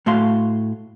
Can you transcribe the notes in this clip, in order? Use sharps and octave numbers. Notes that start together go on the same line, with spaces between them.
A2 A3 F#4 F5 C6